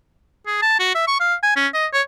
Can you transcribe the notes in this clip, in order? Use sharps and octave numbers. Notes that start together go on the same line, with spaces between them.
G#4
A5
F#4
E5
C#6
F5
G#5
C#4
D#5
C#5